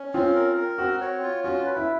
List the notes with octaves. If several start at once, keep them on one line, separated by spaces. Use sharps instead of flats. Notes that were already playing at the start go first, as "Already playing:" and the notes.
Already playing: C#4
C4 F4
A#4
A#4
C4 F#4
C#5
F4
C#4 F#4
B4
E4